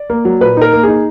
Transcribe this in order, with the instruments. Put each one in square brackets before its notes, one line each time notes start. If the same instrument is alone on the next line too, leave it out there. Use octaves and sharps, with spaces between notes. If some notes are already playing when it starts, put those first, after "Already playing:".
Already playing: [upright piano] D5
[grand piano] A#3
F#3
[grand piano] A#2 [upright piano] B4
[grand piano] D#4 [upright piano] A#4
[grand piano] A#3
[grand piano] D#4 [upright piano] G#4